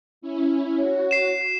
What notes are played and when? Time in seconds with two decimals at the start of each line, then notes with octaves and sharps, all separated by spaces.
0.21 C#4 E4
0.78 F#4 C#5
1.11 C7 E7